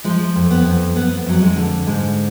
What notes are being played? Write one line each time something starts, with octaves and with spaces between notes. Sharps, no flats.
F3 G#3
F2
B3
F2
F2 B3
F2 F#3
G#3
D3
G#2 G#3